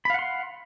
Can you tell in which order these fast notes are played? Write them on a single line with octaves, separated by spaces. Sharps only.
B5 F5 F#5 C6